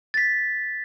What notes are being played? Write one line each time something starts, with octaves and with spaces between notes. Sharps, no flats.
A6 B6